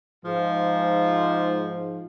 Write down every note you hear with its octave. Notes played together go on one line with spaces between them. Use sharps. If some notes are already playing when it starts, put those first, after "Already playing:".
G#2 F3